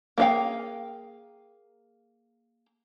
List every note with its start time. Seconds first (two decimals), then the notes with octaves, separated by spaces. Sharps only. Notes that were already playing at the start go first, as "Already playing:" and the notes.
0.18 A#3 D4 G#4 F5 G5